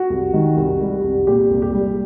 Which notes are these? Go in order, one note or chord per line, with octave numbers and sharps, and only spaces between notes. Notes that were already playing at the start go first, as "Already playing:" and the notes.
Already playing: F#4
C2
D#3
C2
G3
C2
A#2 G4
C2
G4
G3